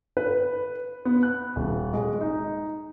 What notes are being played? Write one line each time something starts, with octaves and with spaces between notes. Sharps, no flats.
B4
B3
F#6
D#1
G#3
D#4